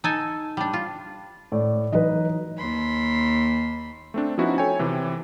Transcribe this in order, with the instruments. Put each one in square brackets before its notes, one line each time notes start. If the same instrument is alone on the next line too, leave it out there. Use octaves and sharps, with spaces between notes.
[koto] D#4 A4 G#5
G3 D4
F4
[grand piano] A2 D5
[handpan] E3 F#3 D#4 [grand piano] B4 D#5
[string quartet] D#2 B5 C6
[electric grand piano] A3 C4 D4
F3 B3 C#4 D#4 E4 F#4
A4 C#5 G5 G#5
C3 E3